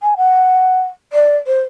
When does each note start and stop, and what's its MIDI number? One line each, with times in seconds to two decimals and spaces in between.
0.01 0.14 80
0.17 0.81 78
1.12 1.36 74
1.46 1.59 72